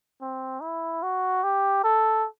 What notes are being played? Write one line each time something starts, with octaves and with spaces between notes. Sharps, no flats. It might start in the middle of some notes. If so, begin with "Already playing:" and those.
C4
E4
F#4
G4
A4